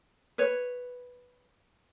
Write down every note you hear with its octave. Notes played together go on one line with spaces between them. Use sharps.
B4 C#5